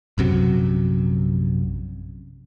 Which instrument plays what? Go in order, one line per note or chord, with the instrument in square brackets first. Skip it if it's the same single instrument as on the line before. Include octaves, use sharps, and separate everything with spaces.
[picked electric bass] A#1 F#2 C3 F#3